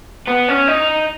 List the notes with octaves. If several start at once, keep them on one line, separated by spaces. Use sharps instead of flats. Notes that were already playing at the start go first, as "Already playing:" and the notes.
B3
C#4
D#4